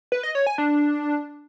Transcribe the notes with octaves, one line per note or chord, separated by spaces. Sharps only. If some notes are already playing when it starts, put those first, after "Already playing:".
B4
D#5
C#5
G#5
D4